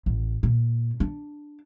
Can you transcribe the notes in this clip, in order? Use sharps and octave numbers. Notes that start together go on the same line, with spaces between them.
A1
A#2
D4